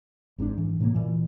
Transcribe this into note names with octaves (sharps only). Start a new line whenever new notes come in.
G#1 G#2 C4 D4
G#2 E3
A2 C3 A3 A#3
A#2 E3